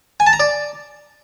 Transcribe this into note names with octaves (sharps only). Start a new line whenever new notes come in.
G#5
A5
A#5
D5